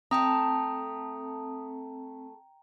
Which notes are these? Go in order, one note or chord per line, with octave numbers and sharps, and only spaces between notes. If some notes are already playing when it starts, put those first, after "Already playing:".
A3 C4 A4 G5 A#5 D#6